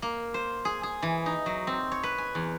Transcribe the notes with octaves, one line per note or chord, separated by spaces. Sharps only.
A#3
C5
G#4
G#4
E3
D#4
F#3
C4
C#5
B4
G#5
E2